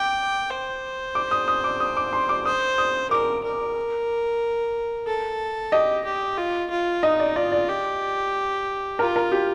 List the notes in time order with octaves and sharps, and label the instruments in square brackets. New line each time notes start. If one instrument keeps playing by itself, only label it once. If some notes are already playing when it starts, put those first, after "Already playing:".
Already playing: [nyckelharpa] G5 [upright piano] D6
[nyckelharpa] C5
[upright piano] D6
D#6
D#6
D6
D#6
D6
C6
D6
[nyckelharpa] C5 [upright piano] D#6
[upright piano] D#6
[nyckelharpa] A#4 [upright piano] D6
[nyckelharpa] A#4
A4
[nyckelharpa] G4 [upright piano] D#5
[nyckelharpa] G4
F4
F4
[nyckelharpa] D#4 [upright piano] D#5
[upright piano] D5
[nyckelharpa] F4 [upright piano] D5
[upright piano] D5
[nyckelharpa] G4
[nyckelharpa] F4 [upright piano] A#4
[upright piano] A#4
G4